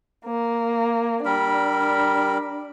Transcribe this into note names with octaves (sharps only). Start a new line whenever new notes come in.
A#3
G3 D4 A#4 B5